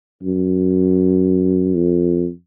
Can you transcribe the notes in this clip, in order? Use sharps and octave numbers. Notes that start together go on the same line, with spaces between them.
F#2
F2